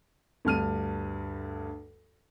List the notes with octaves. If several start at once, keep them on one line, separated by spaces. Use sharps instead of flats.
D2 G2 F6 D#7